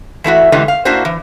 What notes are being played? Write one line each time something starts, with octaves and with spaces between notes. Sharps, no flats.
E3 A3 E4 F#4
A2 D3 E3 G3 G#3
F5
A#3 D4 E4 F#4 C5
E3